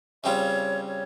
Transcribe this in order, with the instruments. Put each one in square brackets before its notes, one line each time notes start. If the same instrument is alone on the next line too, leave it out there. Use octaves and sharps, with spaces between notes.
[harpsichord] C#3 G3 C4 F4 [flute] C#5 E5
[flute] C#5